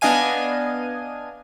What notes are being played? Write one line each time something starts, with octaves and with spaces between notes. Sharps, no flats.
B3 D4 D#5 F5 G#5 D#7